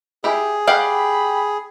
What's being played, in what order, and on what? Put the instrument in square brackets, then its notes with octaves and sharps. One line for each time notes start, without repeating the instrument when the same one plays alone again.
[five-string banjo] E4 G4 [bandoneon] G#4
[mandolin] G4 [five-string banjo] D5 F5 F#5 [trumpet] B5